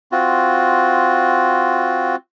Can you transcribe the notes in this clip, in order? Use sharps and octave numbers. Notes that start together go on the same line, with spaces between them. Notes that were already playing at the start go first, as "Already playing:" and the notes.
C4 F4 F#4